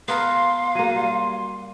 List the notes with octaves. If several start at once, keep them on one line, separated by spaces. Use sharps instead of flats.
B3 A#4 F5 C6
F#3 A#3 D#7
G3 C6